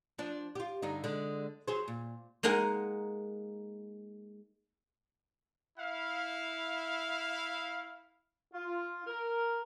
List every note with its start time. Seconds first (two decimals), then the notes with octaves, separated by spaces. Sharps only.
0.18 F3 D4
0.55 F4 G4
0.82 G2 D3 D#4
1.04 D3 G#3
1.68 F#3 G#4 C5
1.88 A#2
2.43 G#3 A#3 D#4 A#4 F#5 G#5
5.79 E4 F5
8.53 F4
9.07 A#4